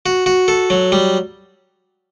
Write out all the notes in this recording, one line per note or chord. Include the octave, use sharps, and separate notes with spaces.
F#4
F#4
A4
F#3
G3